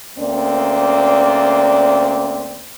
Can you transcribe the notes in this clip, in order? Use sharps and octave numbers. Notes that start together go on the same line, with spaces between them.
D2 A#3 C4 C#4 D5